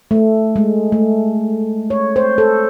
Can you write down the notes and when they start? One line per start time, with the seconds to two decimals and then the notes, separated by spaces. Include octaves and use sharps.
0.11 A3
0.56 G#3
0.92 A3
1.90 C#5
2.16 C5
2.38 A4